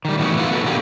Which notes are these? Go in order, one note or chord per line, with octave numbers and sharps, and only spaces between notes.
D#3 G3
A2 E3 B3 D#4 F#4
B3 E4 F4 A#4 F#5
B3 F#4 A4 B4
B2 D3 A#3 D#4 G4